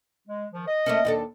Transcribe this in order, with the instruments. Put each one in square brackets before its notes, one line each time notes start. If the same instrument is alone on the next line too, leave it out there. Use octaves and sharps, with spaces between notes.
[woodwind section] G#3
D#3 F3
D#5
[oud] A3 A#3 C#4
D#2 D4 A4